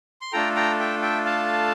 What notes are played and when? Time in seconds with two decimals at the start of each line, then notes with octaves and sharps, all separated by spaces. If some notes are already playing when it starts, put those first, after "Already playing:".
0.21 C6
0.33 A3 D4 F4 A4 G5 A#5
0.56 G5 A#5
0.79 E5 G5
1.02 E5 G5
1.26 F5 A5